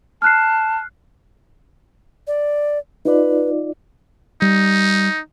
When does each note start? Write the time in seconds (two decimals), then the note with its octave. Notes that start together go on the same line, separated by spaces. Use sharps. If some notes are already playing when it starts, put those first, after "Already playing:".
0.22 A5 F6 F#6 C7
2.27 D5
3.05 D#4 F4 B4 D5
4.42 G3 D#4